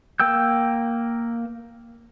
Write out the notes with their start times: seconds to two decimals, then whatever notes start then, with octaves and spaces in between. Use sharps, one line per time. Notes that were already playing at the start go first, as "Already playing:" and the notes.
0.20 A#3 G5 E6 G6